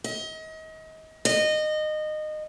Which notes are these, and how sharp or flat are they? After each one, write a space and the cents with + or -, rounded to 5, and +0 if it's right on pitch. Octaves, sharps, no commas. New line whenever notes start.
D#5 +35
D#5 -20